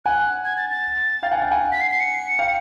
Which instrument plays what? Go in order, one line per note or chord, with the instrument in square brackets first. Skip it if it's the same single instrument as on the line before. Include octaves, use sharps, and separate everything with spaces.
[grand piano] F#5 G#5 [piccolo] F#6
[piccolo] G#6
A6
A6
[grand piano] F5 G5
F#5 G#5
F5 G5
F#5 G#5
[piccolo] B6
C7
C7
C#7
[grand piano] F5 G5